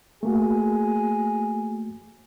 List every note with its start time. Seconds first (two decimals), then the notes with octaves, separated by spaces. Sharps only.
0.23 A3 A#3 F#4 G#4